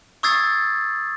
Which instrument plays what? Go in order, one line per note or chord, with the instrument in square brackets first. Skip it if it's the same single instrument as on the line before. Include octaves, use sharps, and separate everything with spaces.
[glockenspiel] C#6 D#6 E6 G#6 A6 C7